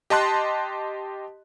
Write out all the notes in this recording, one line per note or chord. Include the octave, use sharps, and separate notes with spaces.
G4 D#5 A5 C6 F#6